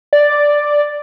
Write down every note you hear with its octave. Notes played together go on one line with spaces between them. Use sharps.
D5